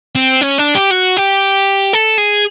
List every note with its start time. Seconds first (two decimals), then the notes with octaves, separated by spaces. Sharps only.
0.15 C4
0.41 C#4
0.58 D4
0.75 G4
0.91 F#4
1.17 G4
1.93 A4
2.18 G#4